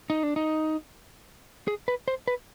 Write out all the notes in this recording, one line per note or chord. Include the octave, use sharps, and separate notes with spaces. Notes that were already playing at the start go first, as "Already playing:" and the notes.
D#4
D4
D#4
G#4
B4
C5
B4